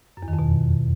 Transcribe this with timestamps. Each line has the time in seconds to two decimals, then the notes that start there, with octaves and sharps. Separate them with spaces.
0.17 F#2
0.23 E2
0.28 D#3
0.33 F2
0.39 B2